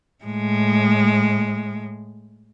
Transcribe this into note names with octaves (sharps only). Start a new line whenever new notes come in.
A2 G#3